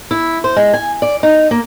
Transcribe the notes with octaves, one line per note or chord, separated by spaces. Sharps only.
E4
C5
G#3
G#5
D5
D#4
A#3